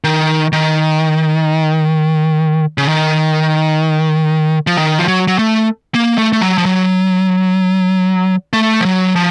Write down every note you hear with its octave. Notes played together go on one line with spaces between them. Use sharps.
D#3
D#3
C#3
D#3
F3
D#3
F3
F#3
F#3
A3
A#3
A3
A3
F#3
F3
F#3
A3
F3
F#3
F3